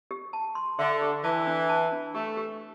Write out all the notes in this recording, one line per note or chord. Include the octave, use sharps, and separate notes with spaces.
G4
A5
C6
D3 E5
G4
E3 A5
D4
A5
D4
A3 G4
G4